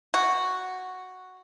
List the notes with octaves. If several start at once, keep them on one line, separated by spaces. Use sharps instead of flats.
F#4